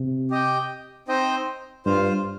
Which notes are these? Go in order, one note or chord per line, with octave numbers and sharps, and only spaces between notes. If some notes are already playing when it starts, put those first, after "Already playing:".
Already playing: C3
G4 D#5 G5
C4 D#4 C5 D#5 G5
G2 F4 C5 F5